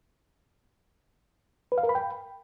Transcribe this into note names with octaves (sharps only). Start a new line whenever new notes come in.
B4
F5
A#4
B5
G5